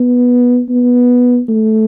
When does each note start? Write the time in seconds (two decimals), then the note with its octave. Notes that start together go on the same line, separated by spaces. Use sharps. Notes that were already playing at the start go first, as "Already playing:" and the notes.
Already playing: B3
0.69 B3
1.48 A3